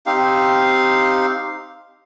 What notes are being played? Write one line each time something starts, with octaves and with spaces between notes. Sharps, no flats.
C4 D#4 G4 F5